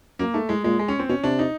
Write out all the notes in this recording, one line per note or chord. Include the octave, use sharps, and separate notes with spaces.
F#2 A#3
G#2 A3
A2 G#3
A#2 G#3
G#3
C#4
C4
B2 C#4
C3 D4
D#4